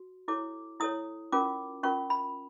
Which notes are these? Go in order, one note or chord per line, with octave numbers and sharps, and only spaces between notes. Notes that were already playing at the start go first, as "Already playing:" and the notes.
Already playing: F#4
E4 A4 C#5 D6
E4 A4 C#5 D#6
C#4 F4 A#4 D6
C#4 F4 A#4 C#6
B5